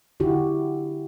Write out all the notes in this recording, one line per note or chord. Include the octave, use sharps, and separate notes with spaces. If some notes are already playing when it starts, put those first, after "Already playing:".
D3 E4 F#4 G4